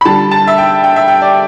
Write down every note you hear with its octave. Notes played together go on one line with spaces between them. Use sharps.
B5
D3 G3 A5
A5
E5
G5
G5
E5
G5
D5